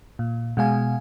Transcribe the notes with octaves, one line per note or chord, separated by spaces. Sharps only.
A#2
B2 G#3 F5 G#5